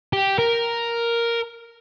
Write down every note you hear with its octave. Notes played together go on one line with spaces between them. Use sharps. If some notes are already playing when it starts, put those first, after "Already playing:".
G4
A#4